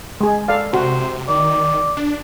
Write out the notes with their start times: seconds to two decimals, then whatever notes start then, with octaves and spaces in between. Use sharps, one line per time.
0.21 G#3 G#4
0.48 A4 D5 F5
0.73 C3 F#4 C5
1.28 D#3 D5
1.97 D4